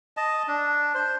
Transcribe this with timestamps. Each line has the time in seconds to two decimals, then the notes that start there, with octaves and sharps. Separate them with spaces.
0.17 D#5 A5
0.48 D4
0.94 C5